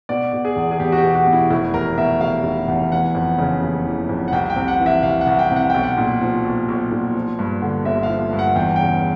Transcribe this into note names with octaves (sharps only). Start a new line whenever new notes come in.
B2 D5
B2
G#4
E2
G#4
E2 G4
F#4
G4
B2
F#4
B2
E4
F1 E4
E2 A#4
B2 E5
F1 F5
F1
E2
E3 F#5
F2
C#3
F#1
E3
F2
F#5
C2 G5
G5
C3
F#5
E3
E5
C2 F5
F#5
C2
G5
C3
F#5
B1 G5
F#5
A#2
F3
B1
B1
A#2
F3
G2
D3
G1 E5
F5
F3
G2
F#5
E2 G5
C#3 G5